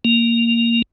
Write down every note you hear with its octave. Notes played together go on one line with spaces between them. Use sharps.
A#3